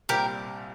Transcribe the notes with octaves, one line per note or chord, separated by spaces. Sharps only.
C2 A#2 G3 C4 G4 A#4